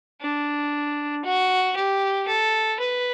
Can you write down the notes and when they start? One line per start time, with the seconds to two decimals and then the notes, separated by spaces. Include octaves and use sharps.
0.22 D4
1.25 F#4
1.76 G4
2.28 A4
2.80 B4